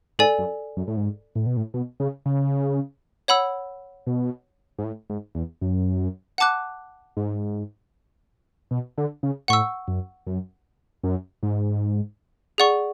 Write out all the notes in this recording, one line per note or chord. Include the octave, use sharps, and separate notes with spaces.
G#2 A4 D5 G#5
F#2
F#2
A2
G#2
A2
B2
A2
B2
C#3
C#3
C#5 F#5 B5 E6
B2
G#2
A2
G#2
E2
F#2
F#5 A5 D6 F#6
G#2
B2
D3
C#3
A2 F#5 C#6 E6
F#2
F#2
F#2
G#2
G#4 D5 F#5 C#6